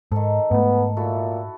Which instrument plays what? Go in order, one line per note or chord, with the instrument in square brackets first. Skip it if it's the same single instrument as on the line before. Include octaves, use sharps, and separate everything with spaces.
[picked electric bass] G#2 [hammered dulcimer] D#3 A4
[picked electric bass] G#2 A3 [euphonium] B3
[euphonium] A#2 [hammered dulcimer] E4 F#4 A4